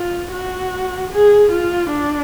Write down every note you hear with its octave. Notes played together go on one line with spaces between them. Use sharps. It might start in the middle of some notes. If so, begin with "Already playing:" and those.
Already playing: F4
F#4
G#4
F4
D4